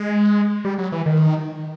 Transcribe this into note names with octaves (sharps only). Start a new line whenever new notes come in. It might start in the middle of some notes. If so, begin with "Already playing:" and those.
Already playing: G#3
G3
F#3
E3
D#3